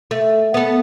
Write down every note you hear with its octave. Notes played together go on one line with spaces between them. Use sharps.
A3
B3 A4